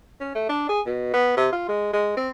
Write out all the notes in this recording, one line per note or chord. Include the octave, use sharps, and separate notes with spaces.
C#4
A3
D4
G#4
B2
B3
C3
F4
G#3
G#3
C4